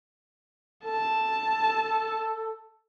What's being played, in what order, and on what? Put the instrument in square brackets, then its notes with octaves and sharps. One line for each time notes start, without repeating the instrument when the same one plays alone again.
[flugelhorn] A4 [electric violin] A5